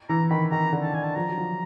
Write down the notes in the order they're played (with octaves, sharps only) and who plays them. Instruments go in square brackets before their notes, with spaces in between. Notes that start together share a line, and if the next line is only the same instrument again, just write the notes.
[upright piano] E3 [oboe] A#5
[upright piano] D#3 [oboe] B5
[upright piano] D#3 [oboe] A#5
[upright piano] D3
[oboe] A5
[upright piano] D3 [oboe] G#5
[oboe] A5
[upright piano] F3 [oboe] A#5
[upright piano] F#3
F3